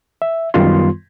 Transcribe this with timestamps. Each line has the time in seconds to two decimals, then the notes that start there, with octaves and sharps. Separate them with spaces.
0.22 E5
0.54 F#2 D#3 G3 B3 F4 C6